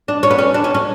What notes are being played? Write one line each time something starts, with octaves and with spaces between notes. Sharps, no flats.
D4
C#4
B3
C#4
D4
C#4
C#4